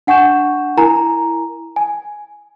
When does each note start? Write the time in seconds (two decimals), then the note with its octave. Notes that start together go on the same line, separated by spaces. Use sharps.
0.07 D4 F#5 G#5 C#6 G6 E7
0.77 E4 A#4 G#5 A#5
1.76 G#5